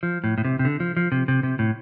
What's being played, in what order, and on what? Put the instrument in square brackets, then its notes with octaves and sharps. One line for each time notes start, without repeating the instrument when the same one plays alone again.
[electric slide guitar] F3
A2
A2
C3
C3
D3
F3
F3
C3
C3
C3
A2